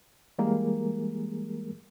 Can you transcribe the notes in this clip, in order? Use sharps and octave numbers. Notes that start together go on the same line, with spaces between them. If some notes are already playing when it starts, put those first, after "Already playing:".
E3 G3 G#3 A#3 G#4 A#4